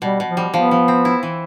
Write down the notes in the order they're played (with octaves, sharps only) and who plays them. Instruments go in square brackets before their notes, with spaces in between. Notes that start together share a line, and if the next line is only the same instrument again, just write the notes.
[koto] B2 [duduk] G3
[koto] B2
[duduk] F3
[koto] G3
[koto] F3 [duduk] B3
[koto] F3
C4
E4
E3